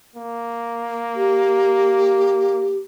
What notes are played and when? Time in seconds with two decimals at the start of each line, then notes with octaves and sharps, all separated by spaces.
0.16 A#3
1.15 G4